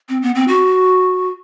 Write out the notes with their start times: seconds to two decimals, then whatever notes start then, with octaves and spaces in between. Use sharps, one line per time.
0.09 C4
0.22 B3
0.35 C4
0.48 F#4